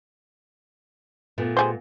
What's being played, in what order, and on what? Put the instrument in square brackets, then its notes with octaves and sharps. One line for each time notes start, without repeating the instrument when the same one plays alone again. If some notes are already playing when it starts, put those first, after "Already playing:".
[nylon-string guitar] A#2 A3 B3
[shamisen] G3 G#4 C5